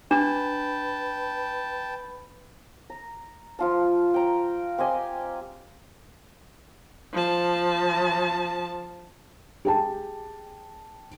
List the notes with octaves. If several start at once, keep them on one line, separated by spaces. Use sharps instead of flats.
D4 B4 G5 A5
A#5
F3 F4 A5
G5 A#5
C4 G4 D#5 G#5
F3 A5
G4 G#4 G5 A5